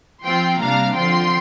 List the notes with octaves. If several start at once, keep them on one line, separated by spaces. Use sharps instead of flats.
F3 C4 F4 G5 C6
C3 G3 A#3 D4 F5 A#5
D3 F3 C4 F4 G5 C6